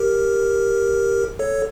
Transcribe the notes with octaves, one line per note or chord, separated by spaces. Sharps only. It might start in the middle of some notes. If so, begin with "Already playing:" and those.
Already playing: G4 A#4
A4 C#5